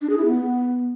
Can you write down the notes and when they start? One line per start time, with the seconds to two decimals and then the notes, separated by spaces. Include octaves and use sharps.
0.02 D4
0.10 G#4
0.18 E4
0.26 B3